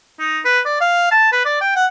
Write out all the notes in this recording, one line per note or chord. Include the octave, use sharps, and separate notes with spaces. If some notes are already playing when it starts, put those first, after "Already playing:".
D#4
B4
D5
F5
A5
B4
D5
G5
F#5